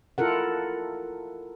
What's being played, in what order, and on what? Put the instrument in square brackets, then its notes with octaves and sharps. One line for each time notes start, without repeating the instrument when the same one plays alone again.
[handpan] E4 F4 A4 A#4 F#5